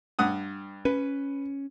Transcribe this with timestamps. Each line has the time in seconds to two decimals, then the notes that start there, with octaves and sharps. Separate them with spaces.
0.19 G2 F#5 D#6
0.85 C#4 B4